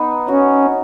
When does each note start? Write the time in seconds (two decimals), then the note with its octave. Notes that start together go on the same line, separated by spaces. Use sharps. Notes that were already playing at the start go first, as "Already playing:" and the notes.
Already playing: B3 D#4
0.28 C#4 F#4